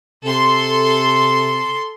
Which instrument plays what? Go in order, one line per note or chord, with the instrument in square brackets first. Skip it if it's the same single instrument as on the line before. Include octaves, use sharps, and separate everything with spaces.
[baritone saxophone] C3 [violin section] A4 C6